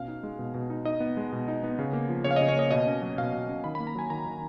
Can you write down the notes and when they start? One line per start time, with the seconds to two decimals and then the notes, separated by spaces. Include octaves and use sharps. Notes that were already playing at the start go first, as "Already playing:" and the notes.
Already playing: B2 C#4 F5
0.08 D#4
0.23 G#3
0.39 B2
0.54 B2
0.70 D#4
0.85 D#4 D#5
1.00 B3
1.17 G#3
1.32 B2
1.48 D#4
1.63 B3
1.79 C#3
1.93 A#3
2.09 F3
2.24 C#3 C#5
2.31 F5
2.36 C#3 D#5
2.49 C#5
2.56 A#3 D#5
2.71 B2 D#5
2.87 C#4
3.02 F#3
3.18 B2 F5
3.33 B2
3.49 C#4
3.64 D#3 B5
3.75 A#3 B5
3.87 A#5
3.95 F#3 G#5
4.10 D#3 A#5
4.26 D#3